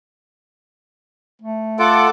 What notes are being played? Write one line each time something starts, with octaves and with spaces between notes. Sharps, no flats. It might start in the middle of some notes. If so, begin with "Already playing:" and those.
A3
F4 A4 F#5 D6